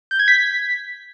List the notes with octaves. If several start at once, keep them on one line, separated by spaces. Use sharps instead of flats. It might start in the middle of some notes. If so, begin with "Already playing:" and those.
G6
G#6
B6